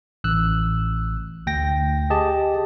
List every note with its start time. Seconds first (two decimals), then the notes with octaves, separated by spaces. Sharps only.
0.24 A1 E6 F#6
1.47 D2 G5 A#6
2.10 G4 G#4 D#5 A5